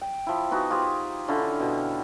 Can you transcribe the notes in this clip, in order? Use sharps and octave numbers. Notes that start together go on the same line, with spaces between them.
G5
F3 E4
B3 D#4 F#4 G#4
F4 G4 G#4 C5
D3 C#4 E4 F4
B2